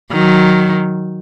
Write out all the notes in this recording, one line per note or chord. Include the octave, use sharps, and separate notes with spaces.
D#3 F#3